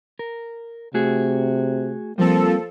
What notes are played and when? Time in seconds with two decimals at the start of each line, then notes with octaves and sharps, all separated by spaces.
0.19 A#4
0.94 C3 A3 F#4 G#4
2.18 F3 G3 A#3 C4 A4